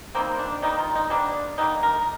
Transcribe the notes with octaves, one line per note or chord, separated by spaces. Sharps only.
D#3 G3 A#3 C4
D4
D#3 G3 A#3 D#4
F4
D#4
D3 G3 A#3 D4
D3 G3 A#3 D#4
A#4